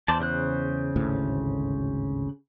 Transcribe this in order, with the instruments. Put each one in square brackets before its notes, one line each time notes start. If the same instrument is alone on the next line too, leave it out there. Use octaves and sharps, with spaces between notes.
[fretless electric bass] E2 [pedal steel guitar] C5 D5 A5
[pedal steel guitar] C#3 C5 F#6
[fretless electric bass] G#1 D2 A2